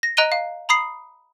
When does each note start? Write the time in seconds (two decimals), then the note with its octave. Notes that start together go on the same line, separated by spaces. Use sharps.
0.03 A#6
0.17 D#5 A#5 F#6 D7 D#7 G7
0.32 F5
0.69 A#5 B5 D#6 C7